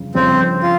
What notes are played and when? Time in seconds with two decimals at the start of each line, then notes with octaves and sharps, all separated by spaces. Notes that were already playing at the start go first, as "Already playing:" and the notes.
Already playing: G1 F2 C#3
0.14 G1 F2 C#3 C4
0.63 F4